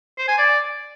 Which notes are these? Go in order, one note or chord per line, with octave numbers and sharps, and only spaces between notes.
C5
G#5
D5